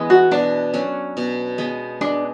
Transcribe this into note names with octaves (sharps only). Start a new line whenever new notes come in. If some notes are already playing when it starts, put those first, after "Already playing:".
Already playing: E3 G#3 B3
F#4
B2 D4
F#3 C#4
B2
G#3 B3
G#3 D4